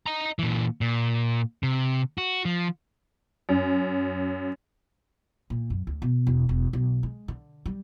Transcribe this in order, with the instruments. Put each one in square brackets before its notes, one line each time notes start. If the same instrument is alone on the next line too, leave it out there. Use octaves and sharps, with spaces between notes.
[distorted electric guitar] D#5 A#5
A#2 E3
A#2
C3
F#4
F3
[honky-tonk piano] F#2
[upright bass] A#2
F#2
D2
B2
E1
E1
B1
G#3
D3
G3